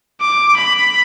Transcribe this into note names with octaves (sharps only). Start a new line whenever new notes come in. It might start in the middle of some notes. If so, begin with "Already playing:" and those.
D6
B5